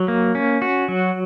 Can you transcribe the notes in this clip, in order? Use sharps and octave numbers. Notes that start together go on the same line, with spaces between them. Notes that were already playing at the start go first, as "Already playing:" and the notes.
Already playing: F#3
A#3
C#4
F#4
F#3